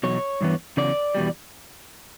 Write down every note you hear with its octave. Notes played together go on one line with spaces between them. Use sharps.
E2 B2 F#3 C#5
G2 E3 B3
E2 C#3 F#3 D5
E2 B2 G3